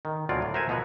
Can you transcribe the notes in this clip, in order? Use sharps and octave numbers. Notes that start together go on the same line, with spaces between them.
D#3
D2 B2 F#3 C4 F4 D5
A2
A#4 C5 E5 F#5 G#5
B2 F3 B3 A#4 F#5